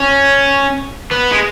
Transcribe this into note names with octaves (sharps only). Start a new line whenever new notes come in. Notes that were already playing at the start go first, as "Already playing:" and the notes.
Already playing: C#4
B3
G#3